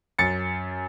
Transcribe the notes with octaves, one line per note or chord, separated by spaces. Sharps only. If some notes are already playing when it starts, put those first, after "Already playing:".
F#2 A6 C#7